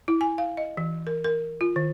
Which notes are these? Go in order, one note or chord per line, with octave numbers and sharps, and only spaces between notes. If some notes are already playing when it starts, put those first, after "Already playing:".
E4
G#5
F5
D#5
E3
A#4
A#4
F4
D#3